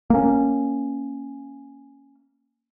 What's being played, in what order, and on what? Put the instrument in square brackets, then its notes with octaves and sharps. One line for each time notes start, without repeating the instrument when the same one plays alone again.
[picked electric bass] A#3 C#4